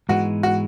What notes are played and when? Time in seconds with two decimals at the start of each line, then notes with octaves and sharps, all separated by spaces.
0.09 G#2 E3 G#3 B3 F#4
0.43 F#4